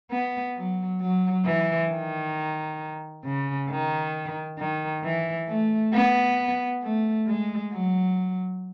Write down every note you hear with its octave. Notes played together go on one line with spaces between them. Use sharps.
B3
F#3
F#3
E3
D#3
C#3
D#3
D#3
E3
A3
B3
A3
G#3
F#3